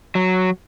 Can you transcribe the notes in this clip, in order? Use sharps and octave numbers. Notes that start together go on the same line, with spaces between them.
F#3